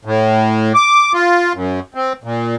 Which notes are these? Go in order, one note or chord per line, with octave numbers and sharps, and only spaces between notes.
A2
D6
F4
F#2
C4
A#2